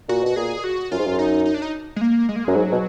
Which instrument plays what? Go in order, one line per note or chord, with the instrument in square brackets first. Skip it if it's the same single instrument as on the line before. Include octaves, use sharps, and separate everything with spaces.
[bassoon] A#2 [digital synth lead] F#4
[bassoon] B2 [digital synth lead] F#4
[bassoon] A#2 [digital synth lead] G#4
[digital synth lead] F#4
[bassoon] F#2 [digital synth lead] F4
[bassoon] G#2
F#2
[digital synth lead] D#4
D#4
D4
D#4
G#3
A#3
G#3
A#3
[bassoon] F#2 [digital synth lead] G#3
[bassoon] G#2 [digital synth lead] F#3
[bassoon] B2